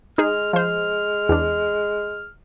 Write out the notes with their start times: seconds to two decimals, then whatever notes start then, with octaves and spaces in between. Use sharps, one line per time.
0.18 G#3 D#4 G#4 F6
0.53 F3 C5 F6
1.29 E2 D4